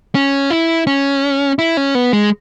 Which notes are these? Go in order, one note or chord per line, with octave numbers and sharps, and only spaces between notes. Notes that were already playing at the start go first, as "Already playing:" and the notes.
C#4
E4
C#4
E4
C#4
B3
G#3